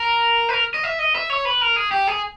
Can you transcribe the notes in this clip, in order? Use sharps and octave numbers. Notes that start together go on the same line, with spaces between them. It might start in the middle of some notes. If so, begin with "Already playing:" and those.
Already playing: A#4
B4
A#4
D#5
E5
D#5
E5
C#5
B4
A#4
G#4
G4
G#4